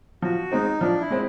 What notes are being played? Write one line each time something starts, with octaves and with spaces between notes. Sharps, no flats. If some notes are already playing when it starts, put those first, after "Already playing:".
F3 F#4
G#3 C4 D#4
F3 D4
E4
G#3 C4